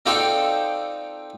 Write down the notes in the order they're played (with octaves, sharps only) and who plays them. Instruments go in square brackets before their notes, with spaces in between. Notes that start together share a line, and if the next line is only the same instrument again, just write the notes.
[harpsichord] C4 D#4 F4 A4 D5 G5